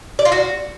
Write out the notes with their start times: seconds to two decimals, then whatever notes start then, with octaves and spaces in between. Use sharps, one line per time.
0.19 D5
0.25 F4
0.32 F#4